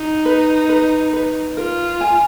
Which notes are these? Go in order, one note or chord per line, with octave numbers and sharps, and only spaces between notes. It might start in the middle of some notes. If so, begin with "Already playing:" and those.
Already playing: D#4
B4
B4
B4
F4 A#4
G#5